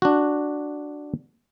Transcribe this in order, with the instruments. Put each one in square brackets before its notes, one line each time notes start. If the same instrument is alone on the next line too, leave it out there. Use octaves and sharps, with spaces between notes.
[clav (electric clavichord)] D4 F#4